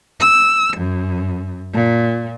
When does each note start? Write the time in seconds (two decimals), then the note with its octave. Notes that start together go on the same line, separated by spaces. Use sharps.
0.20 E6
0.76 F#2
1.72 A#2